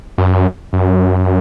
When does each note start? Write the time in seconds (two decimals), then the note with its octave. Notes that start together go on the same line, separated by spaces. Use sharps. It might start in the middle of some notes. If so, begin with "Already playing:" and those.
0.18 F#2
0.73 F#2